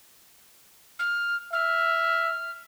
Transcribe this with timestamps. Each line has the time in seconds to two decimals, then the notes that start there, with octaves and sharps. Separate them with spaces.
0.99 F6
1.53 E5 F6